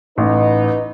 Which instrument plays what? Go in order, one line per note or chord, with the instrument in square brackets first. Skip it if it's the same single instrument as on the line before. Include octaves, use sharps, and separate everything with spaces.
[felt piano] A1 [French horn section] D#4 B4